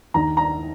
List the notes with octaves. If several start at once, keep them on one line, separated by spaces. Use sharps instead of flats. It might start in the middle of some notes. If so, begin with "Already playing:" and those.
D#2 D#3 A#5
A#5